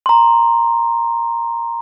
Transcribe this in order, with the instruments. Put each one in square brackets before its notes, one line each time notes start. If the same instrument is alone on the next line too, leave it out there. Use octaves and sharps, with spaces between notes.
[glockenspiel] A#5 C6